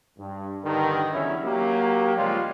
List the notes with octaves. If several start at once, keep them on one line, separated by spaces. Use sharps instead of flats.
G2
G2 D3 D#3
E2 D3 F#3 C#4 E4
F#3 A#3 G4
C#2 F3 G3 G#3 C#4 F4